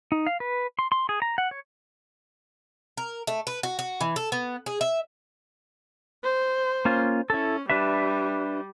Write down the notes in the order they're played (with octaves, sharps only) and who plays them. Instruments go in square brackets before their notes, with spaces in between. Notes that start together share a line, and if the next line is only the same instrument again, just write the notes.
[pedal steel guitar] D#4
F5
B4
C6
C6
G#4
A#5
F#5
C#5
[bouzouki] A#4
A3
B4
F#4
F#4
E3
A4
B3
G#4
E5
[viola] C5
[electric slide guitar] A#3 C#4 F4
[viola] C#4 [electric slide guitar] E4 A4
[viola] G3 [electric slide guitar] D4 B4 E5